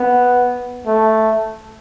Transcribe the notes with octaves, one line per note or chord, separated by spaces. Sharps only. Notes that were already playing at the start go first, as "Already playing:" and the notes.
Already playing: B3
A3